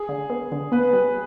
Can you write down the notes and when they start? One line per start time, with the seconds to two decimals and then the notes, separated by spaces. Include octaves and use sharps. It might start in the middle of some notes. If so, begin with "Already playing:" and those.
Already playing: G#4
0.09 D3
0.30 B3
0.52 D3
0.72 B3 B4
0.93 G3